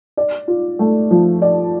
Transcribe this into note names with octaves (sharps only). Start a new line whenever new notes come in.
D5
F4
A3
F3
D5